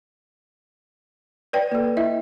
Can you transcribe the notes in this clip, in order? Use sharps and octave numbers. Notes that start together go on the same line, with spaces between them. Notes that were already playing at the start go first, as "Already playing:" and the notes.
B4 C#5 D5 G5
A#3 A4
E4 D#5 E5